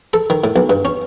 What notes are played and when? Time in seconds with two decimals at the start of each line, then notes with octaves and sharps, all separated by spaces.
0.13 A4
0.30 D#3
0.44 A2
0.56 B1
0.69 G2
0.85 C#4